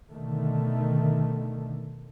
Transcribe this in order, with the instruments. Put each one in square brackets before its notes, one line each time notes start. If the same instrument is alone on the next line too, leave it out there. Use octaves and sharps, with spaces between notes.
[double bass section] B2 D3 D#3 A3